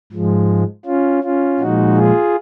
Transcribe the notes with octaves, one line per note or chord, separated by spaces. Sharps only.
G#2 F3 G#3
C#4 F4
C#4 F4
A#2 F3 G#3 D#4 F#4
F4 G#4